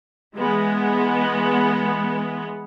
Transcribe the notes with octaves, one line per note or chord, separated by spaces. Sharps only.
E3 G#3 B3